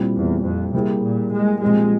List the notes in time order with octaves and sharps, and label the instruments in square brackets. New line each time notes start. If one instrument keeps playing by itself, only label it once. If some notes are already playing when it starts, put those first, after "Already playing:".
Already playing: [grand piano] A#2 G3 C4 E4
[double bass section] E2
F2
[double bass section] C3 [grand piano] G3 A#3 E4 G#4
[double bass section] A#2
G#3
[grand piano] A#2 F3 C4 G4 [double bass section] G#3